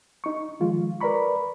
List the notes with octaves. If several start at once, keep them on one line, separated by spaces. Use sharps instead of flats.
D#4 C#6
D#3 F3 G#3 F4
A#4 B4 D5 A#5 B5 C#6